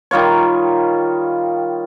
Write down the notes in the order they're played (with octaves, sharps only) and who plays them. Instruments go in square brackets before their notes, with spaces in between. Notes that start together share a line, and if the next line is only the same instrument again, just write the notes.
[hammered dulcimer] D#3 G3 F4 C#5